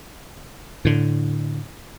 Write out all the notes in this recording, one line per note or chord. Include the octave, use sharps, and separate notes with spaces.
A2 D3